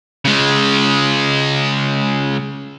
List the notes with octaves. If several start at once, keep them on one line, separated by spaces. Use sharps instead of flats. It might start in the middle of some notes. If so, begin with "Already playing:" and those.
C#3 G#3